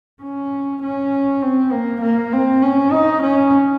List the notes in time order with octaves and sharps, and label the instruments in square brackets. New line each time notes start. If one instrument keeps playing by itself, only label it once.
[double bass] C#4
C#4
C4
A#3
A#3
C4
C#4
D#4
C#4